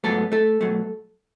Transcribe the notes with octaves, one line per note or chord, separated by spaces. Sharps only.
G#2 F#3 A3 B3 A4
A3 A4
B2 F#3 A3